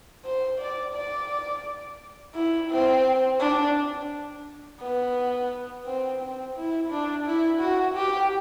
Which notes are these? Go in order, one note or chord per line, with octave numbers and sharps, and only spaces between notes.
C5
D5
D5
E4
C4
D4
B3
C4
C4
E4
D4
E4
F#4
G4